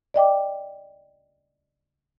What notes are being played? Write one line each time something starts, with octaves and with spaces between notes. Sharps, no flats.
D5 D#5 G5 D6